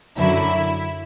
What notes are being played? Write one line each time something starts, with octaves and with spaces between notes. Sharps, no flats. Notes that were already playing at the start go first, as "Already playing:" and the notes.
F#2 D3 F#3 E4